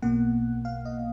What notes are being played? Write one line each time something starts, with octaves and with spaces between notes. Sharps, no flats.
B1 B2 A#3 F#5
F5
D#5